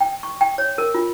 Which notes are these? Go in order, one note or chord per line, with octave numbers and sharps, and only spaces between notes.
G5
C#6
G5
C#5
A#4
F4